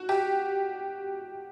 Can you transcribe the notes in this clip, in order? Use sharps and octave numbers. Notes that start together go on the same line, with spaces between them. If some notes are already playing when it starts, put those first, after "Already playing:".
Already playing: F#4
G4